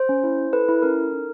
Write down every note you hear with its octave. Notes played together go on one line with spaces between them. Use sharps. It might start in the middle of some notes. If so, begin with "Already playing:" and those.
Already playing: C5
C#4
E4
E4
A4 B4
E4
C#4 A#4
A4
D#4